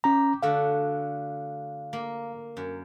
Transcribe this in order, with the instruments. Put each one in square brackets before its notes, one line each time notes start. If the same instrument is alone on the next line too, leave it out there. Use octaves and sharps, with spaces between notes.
[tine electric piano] C#4 A#5 [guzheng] G4
[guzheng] D3 A3 F#4 [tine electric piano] F5
[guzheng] A#3
F#2